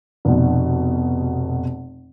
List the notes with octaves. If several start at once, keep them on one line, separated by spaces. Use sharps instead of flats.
F1 B2